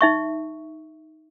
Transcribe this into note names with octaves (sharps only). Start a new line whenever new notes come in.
D#4 E5 C#6